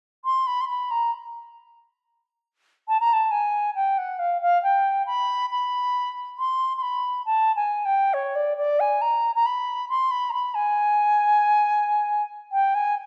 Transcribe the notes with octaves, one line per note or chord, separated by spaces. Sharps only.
C6
B5
C6
B5
A#5
A5
A#5
A5
G#5
G5
F#5
F5
F5
G5
B5
B5
C6
C6
B5
A5
G#5
G5
C#5
D5
D5
G#5
A#5
A#5
B5
C6
B5
A#5
B5
G#5
G5
G#5